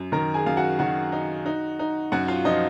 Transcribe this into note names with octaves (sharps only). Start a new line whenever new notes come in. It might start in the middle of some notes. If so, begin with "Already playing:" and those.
Already playing: F#2
D#3 A#4 A#5
G#4 G#5
F#2 F5
F#4 F#5
D#3 F#4 F#5
D#4
D#4
D#4
F#2 F#4 F#5
F4 F5
F3 D#4 D#5